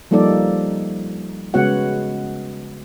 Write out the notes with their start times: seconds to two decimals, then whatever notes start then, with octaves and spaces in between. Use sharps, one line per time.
0.11 F3 G3 A#3 D#4 A4 D5
1.54 C#3 G#3 B3 F#4 C#5 F#5